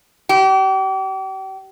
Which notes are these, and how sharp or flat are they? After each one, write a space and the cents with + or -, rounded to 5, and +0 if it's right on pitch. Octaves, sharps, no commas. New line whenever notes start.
G4 -40